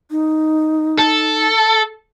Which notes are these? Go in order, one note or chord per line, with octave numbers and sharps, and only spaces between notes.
D#4
A4